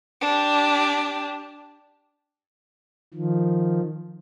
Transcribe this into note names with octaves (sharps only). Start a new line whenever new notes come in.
D4 G4
D#3 F3